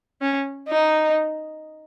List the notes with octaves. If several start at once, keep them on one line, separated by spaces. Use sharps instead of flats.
C#4
D#4